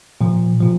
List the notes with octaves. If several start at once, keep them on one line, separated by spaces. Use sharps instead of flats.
A#2 F3
A#2 F3